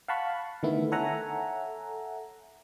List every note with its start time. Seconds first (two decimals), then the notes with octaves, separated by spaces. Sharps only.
0.08 F5 F#5 A5 B5 C#6
0.63 D3 D#3 A3 B3 E4
0.92 A4 C#5 E5 F#5 G#5 A#5